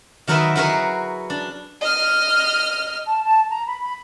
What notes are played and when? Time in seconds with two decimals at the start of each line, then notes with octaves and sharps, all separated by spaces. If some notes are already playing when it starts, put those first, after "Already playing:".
0.28 D#3 F#3 A#4 B4 D#5 E5
0.56 F#3 E4 G#4 A#4 B4 C#5
1.30 D4
1.81 D#5 F6
3.07 A5
3.24 A5
3.50 A#5
3.67 B5
3.79 B5